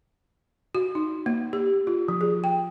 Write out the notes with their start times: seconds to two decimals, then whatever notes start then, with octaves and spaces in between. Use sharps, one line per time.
0.75 F#4
0.95 D#4
1.26 A#3
1.53 G4
1.87 F4
2.08 F3
2.21 G#4
2.44 G5